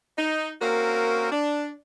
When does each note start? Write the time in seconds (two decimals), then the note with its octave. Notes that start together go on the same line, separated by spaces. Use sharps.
0.18 D#4
0.61 A#3 C4 C#4 F#4 A#4
1.31 D4